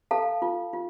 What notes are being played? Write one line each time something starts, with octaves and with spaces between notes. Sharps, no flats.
A4 F5 A5
F4
F4